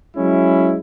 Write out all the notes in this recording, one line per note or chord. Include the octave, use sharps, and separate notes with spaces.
F#3 G#3 C#4 E4